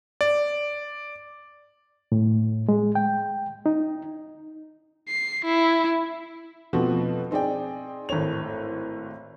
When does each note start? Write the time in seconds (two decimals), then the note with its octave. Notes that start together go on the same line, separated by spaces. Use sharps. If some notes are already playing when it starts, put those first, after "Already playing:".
0.21 D5
2.12 A2
2.69 G#3
2.95 G5
3.66 D#4
5.08 C7
5.45 E4
6.73 B2 F3 A3 C4 F#4
7.31 C4 D#4 G#4 D5 G5
8.09 G#1 A2 A3 C#5 F7